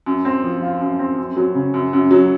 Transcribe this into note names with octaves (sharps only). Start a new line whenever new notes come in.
F#2
C4
F3
F4
F#2
C4
F#2
F#3
C#3
F#2
F#2
F#3